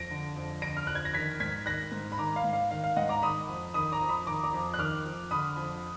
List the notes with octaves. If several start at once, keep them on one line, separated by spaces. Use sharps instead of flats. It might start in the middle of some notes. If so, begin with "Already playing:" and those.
Already playing: F2 A#6 D7
D3
F2
D3 A#6 D7
F6
F2 F#6
G#6
A#6
D#3 G#6 B6
G#2 G#6 B6
D#3 F#6 A#6
G#2
B5
D#3 A#5 D6
F5
G#2
F5
D#3 F5
F5
G#2 D#5 F#5
A#5 D6
D#3 B5 D#6
F2
D#3 B5 D#6
A#5 D6
F2
B5 D#6
D#3 A#5 D6
A#5 D6
F2
F#6
D#3 D6 F6
F2
D3 B5 D#6
F2